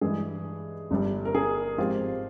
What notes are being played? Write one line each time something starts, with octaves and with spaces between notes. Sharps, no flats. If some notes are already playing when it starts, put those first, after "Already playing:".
G2 E3 G#3 G#4
G1 G2 G3
A#4
G#4
G#2 F3 C4 F4 G4